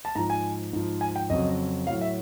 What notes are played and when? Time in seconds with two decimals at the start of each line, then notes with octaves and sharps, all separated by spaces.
0.05 A5
0.15 G#2 A#5
0.18 F3
0.30 G#5
0.73 G#2 F3
1.01 G#5
1.16 G5
1.30 F2 C#3 F#3 D#5
1.87 F#3 F5
1.89 A2
2.01 E5